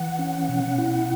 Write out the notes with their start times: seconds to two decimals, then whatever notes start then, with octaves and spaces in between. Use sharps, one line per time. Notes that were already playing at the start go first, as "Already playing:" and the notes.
Already playing: E3 F#5
0.19 C#4
0.49 B2
0.78 E4